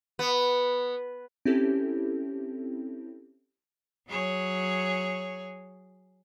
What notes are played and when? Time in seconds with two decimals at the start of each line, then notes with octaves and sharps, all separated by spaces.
0.19 B3
1.45 C4 C#4 E4 G4 A4
4.08 F#3 G#4 C#5